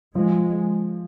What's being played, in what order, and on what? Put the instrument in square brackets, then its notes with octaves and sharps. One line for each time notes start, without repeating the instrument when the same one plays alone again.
[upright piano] F3 [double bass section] G#3